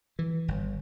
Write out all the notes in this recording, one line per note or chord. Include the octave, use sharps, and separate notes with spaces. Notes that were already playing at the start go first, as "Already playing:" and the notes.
E3
G1